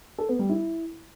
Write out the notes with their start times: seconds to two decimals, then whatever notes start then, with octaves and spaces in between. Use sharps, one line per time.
0.18 A4
0.29 B3
0.39 G3
0.50 E4